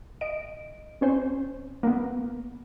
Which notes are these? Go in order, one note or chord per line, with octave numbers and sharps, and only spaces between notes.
D#5 D7
C4 C#4 C5
A#3 B3